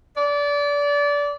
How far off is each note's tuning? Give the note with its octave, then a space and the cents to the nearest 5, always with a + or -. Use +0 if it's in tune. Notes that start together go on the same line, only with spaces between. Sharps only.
D5 -25